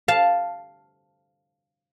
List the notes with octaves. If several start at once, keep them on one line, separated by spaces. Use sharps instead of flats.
F5 A5